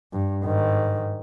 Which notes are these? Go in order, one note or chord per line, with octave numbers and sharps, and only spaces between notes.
G2
G#2 D#3